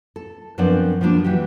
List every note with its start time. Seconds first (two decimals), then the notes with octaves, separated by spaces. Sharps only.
0.16 A4
0.58 F#2 F3 B3 C4 D4 D5
1.01 F3 G3 A#3 D4 F4
1.24 E3 F#3 F#4 G4